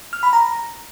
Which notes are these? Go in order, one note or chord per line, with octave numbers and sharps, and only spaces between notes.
F6
B5
A#5